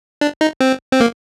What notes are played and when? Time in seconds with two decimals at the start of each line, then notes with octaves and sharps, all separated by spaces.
0.21 D4
0.41 D#4
0.61 C4
0.92 C4
1.00 A#3